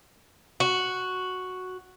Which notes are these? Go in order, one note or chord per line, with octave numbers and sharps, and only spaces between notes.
F#4